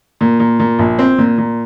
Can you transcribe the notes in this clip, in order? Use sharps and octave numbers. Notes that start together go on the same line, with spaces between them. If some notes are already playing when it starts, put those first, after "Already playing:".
A#2
A#2
A#2
A#1
C4
A#2
A#2